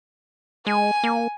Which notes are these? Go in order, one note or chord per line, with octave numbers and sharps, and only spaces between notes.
G#3 G#5
A#3